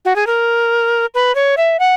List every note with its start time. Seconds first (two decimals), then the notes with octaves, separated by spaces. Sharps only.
0.05 F#4
0.16 G#4
0.27 A#4
1.14 B4
1.35 C#5
1.57 E5
1.79 F#5